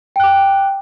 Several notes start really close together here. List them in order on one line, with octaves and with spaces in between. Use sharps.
G5 F#6 D6